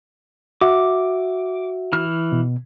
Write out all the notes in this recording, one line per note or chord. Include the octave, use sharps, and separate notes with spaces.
F#4 E5 D6
E3 F6
B2